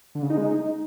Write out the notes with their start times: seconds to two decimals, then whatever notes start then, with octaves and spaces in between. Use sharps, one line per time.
0.15 D3
0.22 C#3
0.30 D#4
0.37 G#3
0.45 D#4